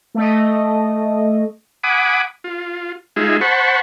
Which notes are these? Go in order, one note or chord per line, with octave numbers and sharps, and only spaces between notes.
A3 D#5
F#5 G#5 B5 D6 D#6
F4
G#3 D#4 F4 G#4 E5
C5 F#5 A5 B5 C#6